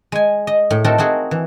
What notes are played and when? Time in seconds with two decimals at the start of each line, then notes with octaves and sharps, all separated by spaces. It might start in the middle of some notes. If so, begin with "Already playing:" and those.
0.12 G#3 G#5
0.47 D#5
0.71 A2
0.84 C4 D#4 F#4 A4 A#4
0.98 C4 D#4 F#4 G#4
1.31 E3